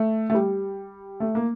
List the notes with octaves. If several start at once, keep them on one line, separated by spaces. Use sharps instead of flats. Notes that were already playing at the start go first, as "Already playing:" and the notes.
Already playing: A3
A3
G3
A3
A#3